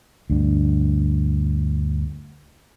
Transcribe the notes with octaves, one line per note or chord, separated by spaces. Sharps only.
D2 G2